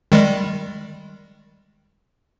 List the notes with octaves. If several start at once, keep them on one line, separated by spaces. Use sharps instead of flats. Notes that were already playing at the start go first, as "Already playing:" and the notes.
D#3 G3 G#3